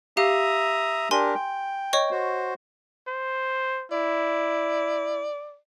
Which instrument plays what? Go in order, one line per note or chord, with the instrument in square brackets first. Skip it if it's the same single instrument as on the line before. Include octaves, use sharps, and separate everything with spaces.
[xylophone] G4 F5 [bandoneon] E5 A#5 D#6
[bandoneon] D4 G4 A#4 [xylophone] G#5 C6
[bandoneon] G5
[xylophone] C#5 D#5 C#6
[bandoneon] F#4 C5
[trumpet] C5
[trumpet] E4 [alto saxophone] D5